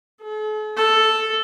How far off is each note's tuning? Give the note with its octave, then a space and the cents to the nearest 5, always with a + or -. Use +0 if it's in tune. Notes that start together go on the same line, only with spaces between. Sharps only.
A4 -45
A4 +0